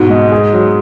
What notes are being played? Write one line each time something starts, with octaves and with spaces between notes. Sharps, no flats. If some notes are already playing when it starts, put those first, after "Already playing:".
Already playing: G#2 B2 F#4
G#3
G#4
F#3